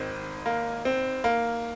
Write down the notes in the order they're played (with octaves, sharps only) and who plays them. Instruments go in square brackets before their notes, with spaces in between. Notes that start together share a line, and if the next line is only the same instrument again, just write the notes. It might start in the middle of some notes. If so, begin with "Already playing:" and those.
Already playing: [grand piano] G#1 G#2 D#3 C4
A#3
C4
A#3